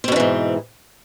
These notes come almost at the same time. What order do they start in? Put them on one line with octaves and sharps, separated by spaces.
C4 B2 D3 E3 G#2